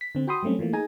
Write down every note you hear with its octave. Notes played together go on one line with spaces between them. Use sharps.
B6
D3 C4
F#4 G5 B5 C6 D#6
F#3 G3 A3 C4 C#4
E3 F3 A3 A#3
D#4 G#4 G#5 A#5